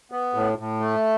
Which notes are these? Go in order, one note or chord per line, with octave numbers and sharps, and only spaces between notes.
B3
A2
A2
A3